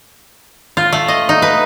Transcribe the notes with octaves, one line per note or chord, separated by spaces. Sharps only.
F4
A3
D#5
D#4
B4